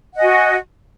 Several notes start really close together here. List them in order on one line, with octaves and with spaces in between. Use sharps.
F#5 D#5 G#5 F#4